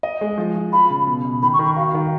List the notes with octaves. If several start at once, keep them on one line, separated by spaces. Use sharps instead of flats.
D#5
G#3
F3
F3
F4 B5
C#3
B2
B2
D#3 B5
C#6
D#3
C#6
F#4 F5
F5
D#3